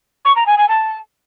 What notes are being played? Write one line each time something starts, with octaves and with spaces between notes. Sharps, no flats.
C#6
A#5
G#5
G#5
A5